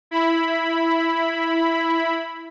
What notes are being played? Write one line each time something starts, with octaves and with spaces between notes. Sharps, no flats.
E4 B5